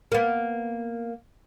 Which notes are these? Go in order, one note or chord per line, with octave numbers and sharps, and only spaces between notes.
A#3 B3